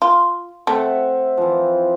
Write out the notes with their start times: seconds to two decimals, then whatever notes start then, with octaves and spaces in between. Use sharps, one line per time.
0.02 F4
0.67 A3 C4 E5 F#5
1.37 E3 F3